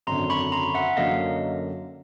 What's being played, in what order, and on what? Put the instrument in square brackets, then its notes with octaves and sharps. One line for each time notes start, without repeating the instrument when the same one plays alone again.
[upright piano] G#1 F#2 D3 [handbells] A#5 C6
[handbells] B5 C#6
A#5 C6
E5 F#5
[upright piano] F#2 D3 F#3 A#3 [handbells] D#5 F5